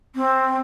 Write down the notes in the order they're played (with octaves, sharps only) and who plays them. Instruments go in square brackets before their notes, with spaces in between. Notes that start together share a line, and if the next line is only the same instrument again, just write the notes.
[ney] C4